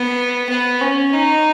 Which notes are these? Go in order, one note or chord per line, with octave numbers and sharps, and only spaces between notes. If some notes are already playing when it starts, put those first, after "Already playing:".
Already playing: B3
B3
C#4
D#4